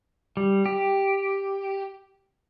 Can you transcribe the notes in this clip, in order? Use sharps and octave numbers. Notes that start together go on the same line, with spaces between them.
G3
G4